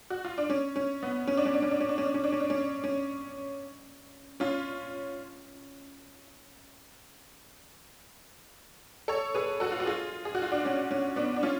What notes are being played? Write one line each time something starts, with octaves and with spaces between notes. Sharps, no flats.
F#4
F4
D4
C#4
C#4
B3
C#4
D4
C#4
D4
C#4
D4
C#4
D4
C#4
D4
C#4
D4
C#4
D4
C#4
C#4
C#4 F4
A4 C#5
G#4 B4
F#4 A4
F4
F#4
F4 G#4
G#4
F#4
F4
D4 F#4
C#4
C#4
B3 D4
D4
C#4 F4